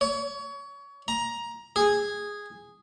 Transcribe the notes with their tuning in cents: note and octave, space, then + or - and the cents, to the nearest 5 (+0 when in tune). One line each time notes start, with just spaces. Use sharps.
C#5 +25
A#5 +15
G#4 -10